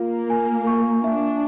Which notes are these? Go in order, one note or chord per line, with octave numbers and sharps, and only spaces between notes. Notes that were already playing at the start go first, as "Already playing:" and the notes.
Already playing: A#3 F4 A#4 F5
G#5
C#6
D4 E5